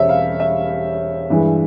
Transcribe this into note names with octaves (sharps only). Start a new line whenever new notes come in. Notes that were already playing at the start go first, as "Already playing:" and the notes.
Already playing: E1 G3 C#4 C5 C#5 E5
F5
E5
G2 E3 G#3